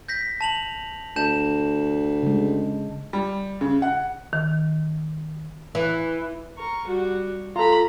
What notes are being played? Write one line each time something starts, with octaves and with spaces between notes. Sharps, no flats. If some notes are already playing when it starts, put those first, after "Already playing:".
G6 A#6 B6
A5 F7 F#7
D2 A5 G6 E7
C#3 G#3
G3
C#3
F#5
D#3
E3
A#4 C#6
G3 F#4
F4 A4 A#5 B5